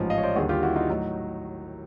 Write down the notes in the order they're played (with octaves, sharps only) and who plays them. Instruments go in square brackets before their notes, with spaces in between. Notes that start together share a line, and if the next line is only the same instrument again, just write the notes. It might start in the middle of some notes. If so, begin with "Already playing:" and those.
Already playing: [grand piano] A1 G#2 F3
D#5 F5
C#5
C5 D5
D#2 D3 G3 F#4 G#4
F4 G4
E4 F#4
D#4 F4
A2 F#3 D#4